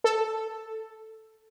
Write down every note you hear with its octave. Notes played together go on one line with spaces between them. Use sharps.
A4